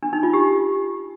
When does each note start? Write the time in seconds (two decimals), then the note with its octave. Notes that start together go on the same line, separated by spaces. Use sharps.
0.03 D4
0.13 D#4
0.23 F4
0.33 G4